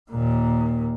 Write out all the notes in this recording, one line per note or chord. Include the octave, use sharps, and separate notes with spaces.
D#2 A#2